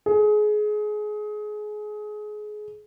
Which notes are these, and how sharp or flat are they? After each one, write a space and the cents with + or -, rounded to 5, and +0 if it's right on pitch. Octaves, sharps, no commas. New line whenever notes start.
G#4 +25